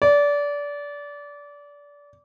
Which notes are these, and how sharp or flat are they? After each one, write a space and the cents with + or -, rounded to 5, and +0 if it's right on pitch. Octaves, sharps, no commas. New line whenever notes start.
D5 -25